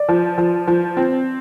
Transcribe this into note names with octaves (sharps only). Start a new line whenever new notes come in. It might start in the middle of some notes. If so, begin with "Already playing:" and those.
Already playing: D5
F3
F3
F3
C4